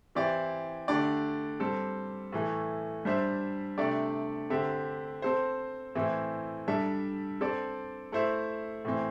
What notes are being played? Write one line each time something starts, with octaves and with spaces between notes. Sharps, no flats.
E3 C4 E4 G4 D5
D3 A3 D4 G4 D5
G3 C4 A4
A2 E3 A3
G3 D4 C5 E5
C3 A3 D4 G4 D5
D3 C4 G4 E5
C4 A4 C5
A2 E3 C4 E4
G3 D4 A4 E5
C4 A4 D5
A3 E4 C5 E5
A2 E3 C4